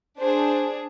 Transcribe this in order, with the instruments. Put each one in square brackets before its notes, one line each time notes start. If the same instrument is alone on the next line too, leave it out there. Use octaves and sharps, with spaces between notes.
[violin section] D4 G#4 C5